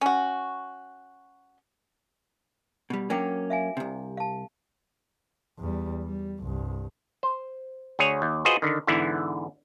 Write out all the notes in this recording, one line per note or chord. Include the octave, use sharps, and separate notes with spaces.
C#4 F#4
B2 G3
F#3 A#3 C#4 D4 G5 D6
E5 F5 G#5
C2 C3
F5 A5
E2 G3
G3
C2 G2
C5
D2 G#4 C#5
D#2
F4 F#4 G#4 B4 C5 D#5
D3 D#3
G#2 D3 E3 B3 E4